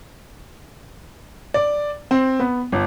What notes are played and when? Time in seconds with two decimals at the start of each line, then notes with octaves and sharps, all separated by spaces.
1.54 D5
2.11 C4
2.40 B3
2.72 G1